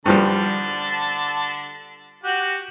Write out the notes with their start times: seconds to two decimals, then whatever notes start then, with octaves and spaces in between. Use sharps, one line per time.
0.06 G2 D3 F3 G3 A5
2.24 F#4 G4 F#5